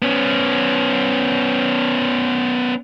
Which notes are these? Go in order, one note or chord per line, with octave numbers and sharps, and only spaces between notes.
B3 C#4